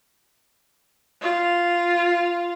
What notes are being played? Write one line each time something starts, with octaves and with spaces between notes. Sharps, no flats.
F4